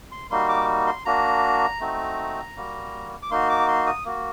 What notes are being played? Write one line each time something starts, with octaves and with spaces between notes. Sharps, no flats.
C6
G3 A#3 D#4 F#4 C6
D6
C6
A#3 D4 F#4 A#5
A3 C4 D#4 F#4
G3 A#3 F#4
D6
A#3 D#4 F#4 C6
D6
C6
D#6
A#3 F#4